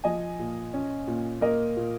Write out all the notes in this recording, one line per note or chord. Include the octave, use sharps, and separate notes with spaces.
F3 D#5 G#5
A#2
C#4
A#2
A#3 A#4 D#5
A#2